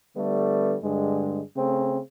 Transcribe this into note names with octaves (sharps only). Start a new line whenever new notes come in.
D3 G3 A3 B3
G2 D3 G#3
C#3 A3 C4